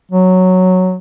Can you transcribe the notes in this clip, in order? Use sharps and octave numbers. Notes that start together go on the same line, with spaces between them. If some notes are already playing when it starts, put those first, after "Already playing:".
F#3